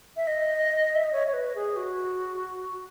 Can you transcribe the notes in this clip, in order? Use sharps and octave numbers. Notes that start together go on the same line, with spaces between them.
E5
D#5
E5
D#5
C#5
C#5
B4
G#4
F#4